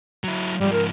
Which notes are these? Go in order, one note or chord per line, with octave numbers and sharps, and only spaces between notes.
F#3 E4
G#2 F3 G3
A#4